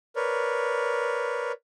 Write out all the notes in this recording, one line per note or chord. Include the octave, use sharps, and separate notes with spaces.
A#4 B4 C#5 D5